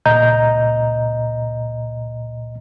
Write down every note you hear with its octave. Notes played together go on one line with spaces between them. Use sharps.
C#2 A#2 D#5 A#5 G6